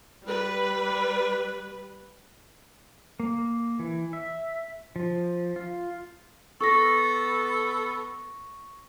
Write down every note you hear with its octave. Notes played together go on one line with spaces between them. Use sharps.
G3 B4
A#3
E3
E5
F3
F4
B3 A4 C#6 A#6